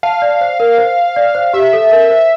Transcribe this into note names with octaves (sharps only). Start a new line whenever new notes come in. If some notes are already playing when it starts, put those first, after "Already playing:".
F5 A5
D5
C5
A#4
C5
D5
C5
G4 E5
A4
A#4
C5